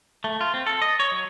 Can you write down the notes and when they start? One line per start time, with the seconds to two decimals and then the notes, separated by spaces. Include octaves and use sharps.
0.24 A3
0.41 F4
0.54 C4
0.67 A4
0.82 D#5
1.00 C#5
1.12 F#3